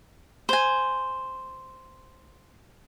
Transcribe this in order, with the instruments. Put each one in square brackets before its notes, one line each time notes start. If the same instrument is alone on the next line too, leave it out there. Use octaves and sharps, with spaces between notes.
[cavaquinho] C5 G#5